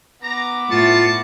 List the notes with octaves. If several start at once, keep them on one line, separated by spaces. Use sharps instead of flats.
B3 A#5 D6
A2 F4 A5 C#6